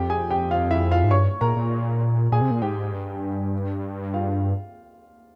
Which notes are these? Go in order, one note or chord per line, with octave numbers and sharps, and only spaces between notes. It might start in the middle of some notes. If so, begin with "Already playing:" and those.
Already playing: F2 G4 G5
G#4 G#5
G4 G5
F4 F5
E4 E5
F4 F5
G#2
G2 C#5 C#6
A#2 A#4 A#5
A#2
A#2 G#4 G#5
C3
A#2
G#2 G4 G5
G2
F4 F5